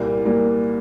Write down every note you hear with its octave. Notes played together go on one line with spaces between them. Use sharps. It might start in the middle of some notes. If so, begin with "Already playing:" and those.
Already playing: C2 A#2 G3 A#3
A#2 G3 A#3